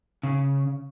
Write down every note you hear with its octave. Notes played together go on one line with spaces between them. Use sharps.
C#3